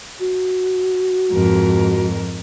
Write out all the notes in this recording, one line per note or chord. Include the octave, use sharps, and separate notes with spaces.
F#4
F2 G#2 A#4